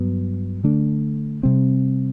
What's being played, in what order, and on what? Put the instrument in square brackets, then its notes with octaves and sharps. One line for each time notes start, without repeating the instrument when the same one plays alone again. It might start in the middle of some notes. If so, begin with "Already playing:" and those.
Already playing: [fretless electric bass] G2 F#3 B3
D3 A3 D4
C3 G3 C4